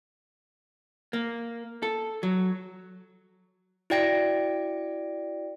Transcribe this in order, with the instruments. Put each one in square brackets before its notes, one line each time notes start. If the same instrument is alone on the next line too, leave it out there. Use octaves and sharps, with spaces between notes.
[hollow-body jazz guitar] A#3
A4
F#3
[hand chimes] E4 F#4 D5 G5 A#6 D7